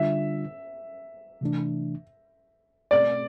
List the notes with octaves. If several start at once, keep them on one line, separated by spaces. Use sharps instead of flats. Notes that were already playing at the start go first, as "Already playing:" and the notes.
Already playing: D3 G3 D4 F4 E5
C3 E3 A3 D4
B2 A3 C4 D5